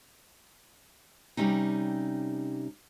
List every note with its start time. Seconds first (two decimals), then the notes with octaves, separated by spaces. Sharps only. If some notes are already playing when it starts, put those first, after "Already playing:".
1.37 C3 G3 A3 C#4 D#4